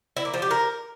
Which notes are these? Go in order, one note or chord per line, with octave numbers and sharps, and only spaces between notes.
E4
A#3
F3
G4
A#4